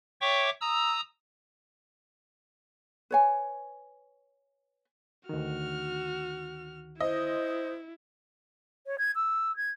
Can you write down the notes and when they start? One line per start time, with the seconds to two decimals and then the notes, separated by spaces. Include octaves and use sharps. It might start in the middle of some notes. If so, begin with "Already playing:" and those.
0.21 C#5 E5 G5 C#6 D6
0.61 A#5 D#6 E6
3.11 B4 C#5 G#5
5.29 D2 D#3 F#4 F6
7.00 E4 C5 D#5
8.86 C#5
8.98 G#6
9.15 E6
9.56 G#6